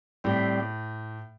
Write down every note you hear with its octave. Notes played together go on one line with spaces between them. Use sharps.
A2 G3 C4 G4